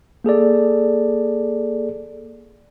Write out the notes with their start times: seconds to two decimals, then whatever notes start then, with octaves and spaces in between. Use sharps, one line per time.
0.24 A#3 G#4 A4 D5